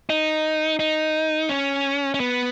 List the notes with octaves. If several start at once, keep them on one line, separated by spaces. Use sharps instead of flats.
D#4
D#4
C#4
C#4
B3